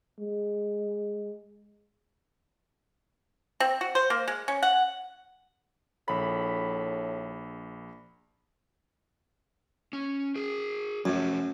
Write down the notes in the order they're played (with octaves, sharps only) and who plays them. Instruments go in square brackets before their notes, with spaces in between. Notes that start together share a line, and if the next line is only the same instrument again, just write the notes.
[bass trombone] G#3
[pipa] C4
F#4
C5
A#3
G#3
C#4
F#5
[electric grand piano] A#1 B6 [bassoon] A2 [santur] B5
[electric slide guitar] C#4
G#4 A#4
[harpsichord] F#2 [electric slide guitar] F3 A3